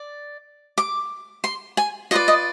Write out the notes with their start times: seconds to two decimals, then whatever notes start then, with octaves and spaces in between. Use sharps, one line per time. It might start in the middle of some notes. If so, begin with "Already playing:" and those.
Already playing: D5
0.78 D6
1.44 C6
1.77 G#5
2.11 F4 B4 D5 D#5
2.28 D#5